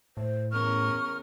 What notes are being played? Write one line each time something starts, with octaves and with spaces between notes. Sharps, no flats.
A2 C5
E2 C#4 A#4 C#6 F6